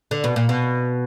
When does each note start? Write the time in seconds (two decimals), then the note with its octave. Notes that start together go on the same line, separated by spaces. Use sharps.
0.11 D3
0.24 B2
0.36 A#2
0.49 B2